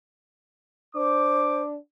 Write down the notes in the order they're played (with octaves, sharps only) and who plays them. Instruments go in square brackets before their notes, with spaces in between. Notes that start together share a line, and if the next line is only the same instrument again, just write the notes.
[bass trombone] D4 [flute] C5 [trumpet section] D6